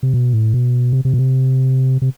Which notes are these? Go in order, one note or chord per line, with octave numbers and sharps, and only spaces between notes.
C3
B2
A2
B2
C3
C3
B2
C3
C3